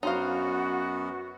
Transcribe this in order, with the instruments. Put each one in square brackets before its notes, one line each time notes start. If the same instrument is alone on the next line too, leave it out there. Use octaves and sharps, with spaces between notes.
[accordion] F#2 B3 [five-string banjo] D#4 C5 F5 [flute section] F#4